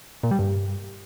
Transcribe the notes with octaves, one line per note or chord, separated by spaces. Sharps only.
A#2
G3
G2